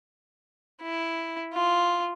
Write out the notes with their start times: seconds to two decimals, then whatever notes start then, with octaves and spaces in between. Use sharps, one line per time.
0.82 E4
1.53 F4